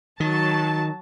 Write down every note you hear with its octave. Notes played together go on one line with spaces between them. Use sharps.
D#3 F#3 A5